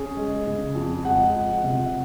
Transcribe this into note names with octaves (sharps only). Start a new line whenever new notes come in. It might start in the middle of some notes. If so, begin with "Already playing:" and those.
Already playing: C#4 G#4
G#3
C#3
F2
G#3 F#5
F3
C3